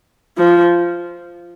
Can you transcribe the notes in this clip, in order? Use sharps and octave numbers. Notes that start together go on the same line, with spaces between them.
F3